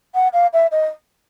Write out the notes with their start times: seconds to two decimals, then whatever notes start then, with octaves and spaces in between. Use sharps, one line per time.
0.15 F#5
0.33 F5
0.53 E5
0.72 D#5